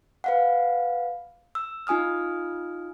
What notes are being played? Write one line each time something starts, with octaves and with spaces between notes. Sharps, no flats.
B4 F5 F#5
E6
D#4 F4 G#5 D#6 F6